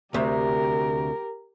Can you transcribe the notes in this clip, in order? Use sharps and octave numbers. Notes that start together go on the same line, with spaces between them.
D2 C3 G4 A#4